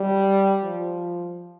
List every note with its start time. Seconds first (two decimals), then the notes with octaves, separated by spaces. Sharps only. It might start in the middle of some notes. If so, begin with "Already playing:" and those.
Already playing: G3
0.64 F3